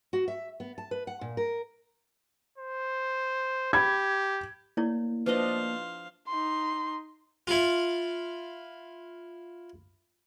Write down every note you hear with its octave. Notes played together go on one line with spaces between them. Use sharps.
F#4
E5
B3
A5
B4
F#5
A#2
A#4
C5
G4 B5 G#6
A#3 E4 C#5 D5
F3 D4 B4 C5 D#5 F5
D#4 C6
E4 F4